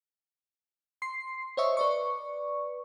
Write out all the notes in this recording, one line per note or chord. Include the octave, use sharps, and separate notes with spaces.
C6 C7
C5 C#5 D#5 E5 C#6
B4 D5 C#6